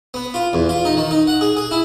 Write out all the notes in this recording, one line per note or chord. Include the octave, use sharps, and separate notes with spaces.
B3
F4
E2
F4
D#4
D#3
D#4
F#5
G#4
G#4
E4